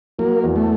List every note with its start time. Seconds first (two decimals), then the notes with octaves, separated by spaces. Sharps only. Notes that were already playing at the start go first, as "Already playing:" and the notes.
0.18 F#3 A#3
0.43 E2
0.56 A3